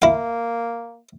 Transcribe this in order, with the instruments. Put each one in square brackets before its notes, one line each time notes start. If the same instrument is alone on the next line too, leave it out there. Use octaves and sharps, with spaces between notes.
[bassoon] A#3 [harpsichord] E4 F5